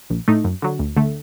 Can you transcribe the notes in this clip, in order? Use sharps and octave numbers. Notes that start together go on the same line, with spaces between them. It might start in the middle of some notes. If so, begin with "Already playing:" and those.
A#1
A2 A3 D#4
F#2
D3 F#3
D2
D3 A3